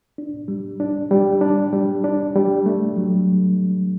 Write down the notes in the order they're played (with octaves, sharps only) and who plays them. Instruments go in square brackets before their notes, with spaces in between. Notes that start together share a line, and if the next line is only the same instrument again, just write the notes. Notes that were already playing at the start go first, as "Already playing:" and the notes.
[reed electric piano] D4
G3
D4
G3
D4
G3
D4
G3
A3
F#3